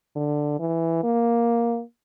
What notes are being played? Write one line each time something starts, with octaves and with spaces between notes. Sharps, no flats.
D3
E3
A#3